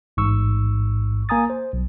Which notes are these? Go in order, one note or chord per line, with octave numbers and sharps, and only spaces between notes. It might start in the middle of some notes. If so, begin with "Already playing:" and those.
A1 G#2 C#6 E6
A#3 G#5 A#5 D#6 A6
C5
B1